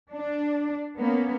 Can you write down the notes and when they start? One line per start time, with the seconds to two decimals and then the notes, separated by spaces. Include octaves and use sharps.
0.12 D4
0.99 A#3 B3 C#4